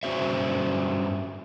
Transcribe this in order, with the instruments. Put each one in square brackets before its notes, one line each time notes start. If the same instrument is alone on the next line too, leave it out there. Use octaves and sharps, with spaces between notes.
[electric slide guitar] G2 C#4 F#4 C5 E5